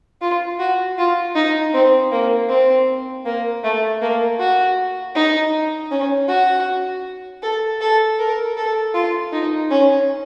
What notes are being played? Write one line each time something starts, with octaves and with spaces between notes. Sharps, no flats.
F4
F#4
F4
D#4
C4
A#3
C4
A#3
A3
A#3
F#4
D#4
C#4
F#4
A4
A4
A#4
A4
F4
D#4
C#4